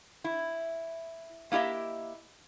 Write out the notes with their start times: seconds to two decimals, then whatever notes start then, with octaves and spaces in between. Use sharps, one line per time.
0.24 E4
1.52 A#3 E4 G4 D#5 E5